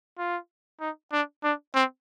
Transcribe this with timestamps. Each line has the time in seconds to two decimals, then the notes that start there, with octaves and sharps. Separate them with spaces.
0.18 F4
0.80 D#4
1.12 D4
1.44 D4
1.75 C4